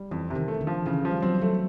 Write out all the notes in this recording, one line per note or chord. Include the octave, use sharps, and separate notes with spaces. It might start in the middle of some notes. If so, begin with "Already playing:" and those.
Already playing: G3
F2 E3
C3
D#3
A3
D3
F3
C#3 E3
F3
G3
F#3 C4
F#3 A3